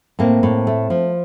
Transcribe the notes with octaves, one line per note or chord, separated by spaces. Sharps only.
A2 A#3 C4
A2
A3
F3